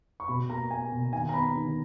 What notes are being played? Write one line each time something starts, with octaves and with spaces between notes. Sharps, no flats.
C#6
B2 B5
A#3 A#5
A#3 G#5
B2
D#3 G#5
A#5
B3 B5
D#3